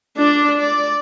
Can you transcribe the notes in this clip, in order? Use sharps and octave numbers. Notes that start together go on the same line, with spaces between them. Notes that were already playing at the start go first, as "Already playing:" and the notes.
D4 D5
D5